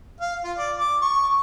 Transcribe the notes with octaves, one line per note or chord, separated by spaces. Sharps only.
F5
F4
D5
D6
C#6